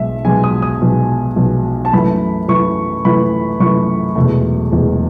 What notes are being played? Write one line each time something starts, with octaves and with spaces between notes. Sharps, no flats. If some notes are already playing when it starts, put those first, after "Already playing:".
Already playing: B1 B2 G#3 E5
B1 B2 G#3 G#5
D#6
D#6
B1 B2 G#3
B1 B2 G#3
A5
F#2 E3 A3 B5
F#2 E3 A3 C#6
F#2 E3 A3 B5
F#2 E3 A3 C#6
E1 E2 B2 A3
E1 E2 B2 A3